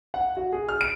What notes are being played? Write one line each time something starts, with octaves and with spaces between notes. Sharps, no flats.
F#5
F#4
G#4
F6
D7